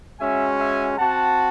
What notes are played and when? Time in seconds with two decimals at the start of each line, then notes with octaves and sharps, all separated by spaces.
0.19 G#3 C#4 F#4 E5 G#5
0.59 E5 G#5
0.97 C4 F#4 F#5 A5